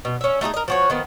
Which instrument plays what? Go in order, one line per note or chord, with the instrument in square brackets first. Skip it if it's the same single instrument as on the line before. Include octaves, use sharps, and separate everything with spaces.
[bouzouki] B2
C#4 E5
A3 D#4 F#4 G#4
A#4 D#5
F3 F#4 C#5
D#3 F3 B3